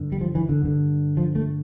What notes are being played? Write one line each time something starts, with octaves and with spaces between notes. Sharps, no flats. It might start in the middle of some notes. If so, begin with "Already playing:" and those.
Already playing: G2 D3
G3
F3
E3
D3
G2 D3
F3
A3